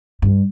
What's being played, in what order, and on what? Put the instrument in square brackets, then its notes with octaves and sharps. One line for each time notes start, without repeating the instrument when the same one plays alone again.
[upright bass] G2